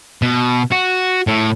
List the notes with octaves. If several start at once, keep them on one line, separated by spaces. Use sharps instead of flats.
B2
F#4
A2